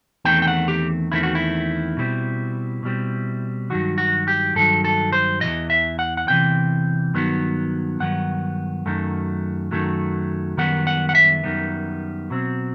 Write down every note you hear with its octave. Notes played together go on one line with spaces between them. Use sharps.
E2 D#3 A3 C4 G5
G5
F#5
G4
E2 D#3 A3 C4 E4
F#4
E4
B2 G3 C4
B2 G3 C4
G2 D#3 F#3 F#4
F#4
G4
G2 D#3 F#3 A4
A4
C5
C3 E3 D#5
E2
E5
F#5
F#5
E2 C3 E3 G5
G2 D#3 F#3 B3
G2 D#3 F#3 B3 F#5
F#2 D#3 F#3 A3
F#2 D#3 F#3 A3
F#2 D#3 G3 B3 F#5
F#5
F#5
E5
F#2 D#3 G3 B3
B2 F#3 C4